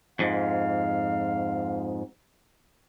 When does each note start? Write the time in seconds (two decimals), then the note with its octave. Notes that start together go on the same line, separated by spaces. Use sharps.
0.19 F2 G#2 F5